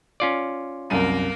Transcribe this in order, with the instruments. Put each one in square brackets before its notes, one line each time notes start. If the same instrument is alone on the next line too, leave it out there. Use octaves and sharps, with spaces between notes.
[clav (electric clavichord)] C#4 F4 D5
[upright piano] C2 F#2 D#7 [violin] A#3 A#4